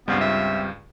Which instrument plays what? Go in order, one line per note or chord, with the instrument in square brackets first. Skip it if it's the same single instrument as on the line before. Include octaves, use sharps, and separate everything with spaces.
[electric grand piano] C#2 G2 [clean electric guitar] G3 C4 F4 [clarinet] B3
[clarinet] E5